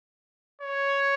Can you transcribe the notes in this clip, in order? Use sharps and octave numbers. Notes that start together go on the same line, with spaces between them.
C#5